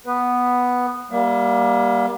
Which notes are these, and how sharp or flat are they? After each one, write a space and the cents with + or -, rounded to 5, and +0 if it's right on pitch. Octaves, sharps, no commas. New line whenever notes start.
B3 +0 B4 +0
G3 +0 A#3 +25 E5 +35